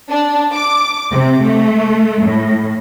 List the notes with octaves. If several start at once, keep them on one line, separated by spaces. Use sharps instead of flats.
D4
D6
C3
A3
A2